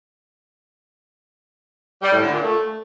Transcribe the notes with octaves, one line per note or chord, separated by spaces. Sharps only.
G3
A2
D3
A#2
A3